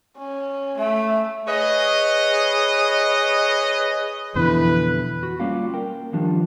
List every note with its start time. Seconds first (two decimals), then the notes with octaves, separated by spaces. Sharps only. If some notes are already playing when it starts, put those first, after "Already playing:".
0.18 C#4
0.78 A3 E5
1.48 G#4 B4 C#5 D#5
4.35 F2 B2 D3 E3 B4
5.23 F#4
5.40 G3 A#3 C#4 F4 G4 F5
5.74 A#4 G5
6.13 D#3 F3 G3 D4 F4